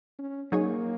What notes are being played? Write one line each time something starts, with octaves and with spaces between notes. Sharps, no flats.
C#4
F#3 A#3 D#4 G#4 C#5